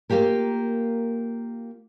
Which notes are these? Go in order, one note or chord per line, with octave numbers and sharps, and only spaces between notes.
A#3 F4 G4 A#4